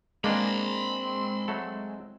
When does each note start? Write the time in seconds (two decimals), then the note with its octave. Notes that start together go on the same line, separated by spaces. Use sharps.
0.24 G#3 A#3 C4 D4 D#5 B5 C6
1.48 F#3 A3 A4